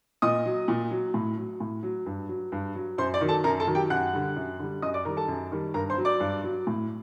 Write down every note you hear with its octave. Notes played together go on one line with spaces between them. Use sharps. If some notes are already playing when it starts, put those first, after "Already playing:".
A#2 D#5 D#6
F#3
A#2
F#3
A2
F#3
A2
F#3
G2
F#3
G2
F#3
F#2 C5 C6
D5
D#3 F#3
A4 A5
F#2 A#4 A#5
A4 A5
D#3 F#3
G4 G5
F#2 F#5 F#6
D3 G3
F#2
D3 G3
F#2 D#5 D#6
D5 D6
D#3 G3 A#4 A#5
A4 A5
F#2
D#3 G3
G2 A#4 A#5
C5 C6
F#3
D5 D6
G2
F#3
A2